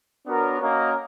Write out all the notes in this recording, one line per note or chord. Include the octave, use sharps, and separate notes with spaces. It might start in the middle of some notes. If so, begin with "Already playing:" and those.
B3 D4 F#4 A#4 C#5
A#3 C#4 F#4 A#4 D#5